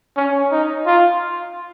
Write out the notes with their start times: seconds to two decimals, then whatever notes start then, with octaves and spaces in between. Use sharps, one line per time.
0.17 C#4
0.52 D#4
0.86 F4